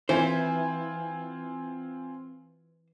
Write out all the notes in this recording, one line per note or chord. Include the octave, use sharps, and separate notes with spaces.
E3 C4 F4 C5 G#5